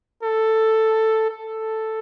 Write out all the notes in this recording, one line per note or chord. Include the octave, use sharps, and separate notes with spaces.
A4
A4